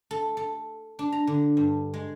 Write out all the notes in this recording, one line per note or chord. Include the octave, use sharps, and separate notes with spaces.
A4
A4
D4
A#5
D3
G2
G#3